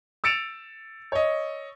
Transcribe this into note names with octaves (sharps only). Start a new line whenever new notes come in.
E6 A6 C#7 D7 E7 F7
C#5 D#5